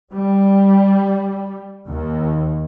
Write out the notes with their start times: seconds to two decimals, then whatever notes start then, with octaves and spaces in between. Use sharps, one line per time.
0.13 G3
1.88 D#2